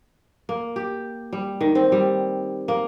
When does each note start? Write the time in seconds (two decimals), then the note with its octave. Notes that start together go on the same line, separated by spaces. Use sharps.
0.49 A#3
0.76 G4
1.33 G3
1.61 D#3
1.75 C4
1.92 G3
2.68 A#3